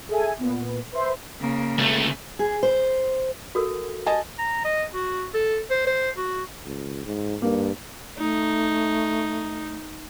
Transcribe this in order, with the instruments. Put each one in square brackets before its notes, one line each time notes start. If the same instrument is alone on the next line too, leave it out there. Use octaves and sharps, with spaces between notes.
[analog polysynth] G#4 A4 E5 G#5
A#2 B3
B4 C5 E5 C6
[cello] C#3 A#3
[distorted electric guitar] C#2 A3
[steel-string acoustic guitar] G#4
C5
[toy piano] F#4 A4 A#4
[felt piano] D#5 G#5 A5
[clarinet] A#5
D#5
F#4
A4
C5
C5
F#4
[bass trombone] C#2
G#2
[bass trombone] G2 [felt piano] A#3
[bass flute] A3 [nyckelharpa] D#4